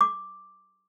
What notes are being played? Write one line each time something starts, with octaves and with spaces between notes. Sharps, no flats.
D6